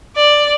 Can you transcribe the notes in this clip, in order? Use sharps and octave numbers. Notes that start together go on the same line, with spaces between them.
D5